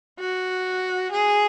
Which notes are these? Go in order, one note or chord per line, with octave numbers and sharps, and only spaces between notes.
F#4
G#4